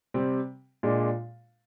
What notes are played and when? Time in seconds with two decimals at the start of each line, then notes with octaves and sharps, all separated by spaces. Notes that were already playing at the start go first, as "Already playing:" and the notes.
0.14 C3 G3 C4
0.83 A#2 G#3 D4